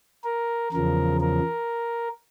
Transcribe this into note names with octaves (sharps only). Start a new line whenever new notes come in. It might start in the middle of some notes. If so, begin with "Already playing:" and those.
A#4
E2 C#3 F3 A#4
A#4